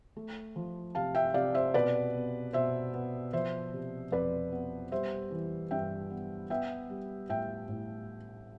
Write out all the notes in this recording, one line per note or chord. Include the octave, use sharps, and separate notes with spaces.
A3
F3
C3 F5 A5
E5 G5
C3 D5 F5
C5 E5
B2 B4 D5
B3
B2 C5 E5
B3
F3 C5 E5
C3
F2 B4 D5
B3
G3 C5 E5
E3
G2 E5 G5
B3
B3 E5 G5
G3
A2 E5 G5
A2